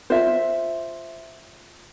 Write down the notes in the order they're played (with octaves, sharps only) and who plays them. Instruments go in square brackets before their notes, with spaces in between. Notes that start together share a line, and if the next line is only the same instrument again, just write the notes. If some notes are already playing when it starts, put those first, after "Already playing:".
[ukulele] F4 C5 E5